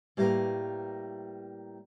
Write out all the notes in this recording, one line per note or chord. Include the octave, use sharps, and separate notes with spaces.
A2 G3 A#3 B3 A#4 B4